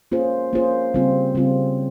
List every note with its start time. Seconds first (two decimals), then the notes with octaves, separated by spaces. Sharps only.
0.12 A#3 C#4 F4 G#4 C5
0.53 A#3 C#4 F4 G#4 C5
0.94 C#3 G3 C4 F4
1.35 C#3 G3 C4 F4